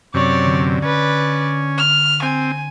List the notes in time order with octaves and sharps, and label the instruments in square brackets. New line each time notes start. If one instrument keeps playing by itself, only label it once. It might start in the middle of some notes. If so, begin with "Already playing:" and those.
[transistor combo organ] F#2 C3 [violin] C#5 D5
[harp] D3
[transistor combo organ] C#4 [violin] B4 D5
[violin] F6
[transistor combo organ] C4 [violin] G#5